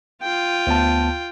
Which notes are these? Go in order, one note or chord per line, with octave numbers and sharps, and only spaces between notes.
F4 G5
D2 B3 A5